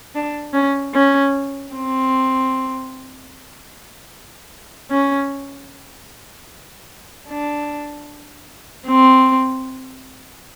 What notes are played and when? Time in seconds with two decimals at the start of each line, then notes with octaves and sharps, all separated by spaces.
0.15 D4
0.54 C#4
0.94 C#4
1.73 C4
4.91 C#4
7.29 D4
8.87 C4